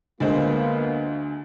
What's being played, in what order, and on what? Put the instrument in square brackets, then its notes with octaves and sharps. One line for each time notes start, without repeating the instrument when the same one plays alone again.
[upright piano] D2 G#3 C5 [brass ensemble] A#3 B3 F4